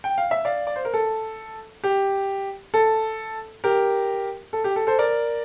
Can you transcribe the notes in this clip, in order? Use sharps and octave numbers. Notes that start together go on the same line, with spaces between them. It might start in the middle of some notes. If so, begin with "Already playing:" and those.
G5
F5
E5
D5 F5
D5
C5
A#4
A4
G4
A4
G4 A#4
A4
G4
A4
A4 C5
A#4 D5